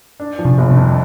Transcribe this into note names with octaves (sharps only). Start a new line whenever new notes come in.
D4
F3
C3
G1
C3
F2